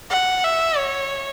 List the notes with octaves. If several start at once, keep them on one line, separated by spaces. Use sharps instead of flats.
F#5
E5
C#5